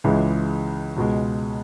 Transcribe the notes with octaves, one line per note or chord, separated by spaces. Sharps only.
C#2 C#3 E3 G#3
C#2 B2 G#3